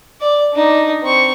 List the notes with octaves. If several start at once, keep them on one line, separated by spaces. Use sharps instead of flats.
D5
D4 D#4
C4 C#6